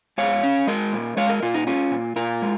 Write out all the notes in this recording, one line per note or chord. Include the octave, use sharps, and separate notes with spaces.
G#2 C#5 F5
C#4
G#3 A#4 D#5
A#2
G#3 C#5 F5
A#4 D#5
A#2 F4
D#4
C#4 F4
A#2
A#2 F4 A#4
G#3